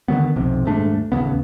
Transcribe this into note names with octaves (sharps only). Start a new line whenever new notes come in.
D3 D#3 F#3 B3
B1 F2 C3
D#1 G#2 A3 D4
A1 D#2 C#3 B3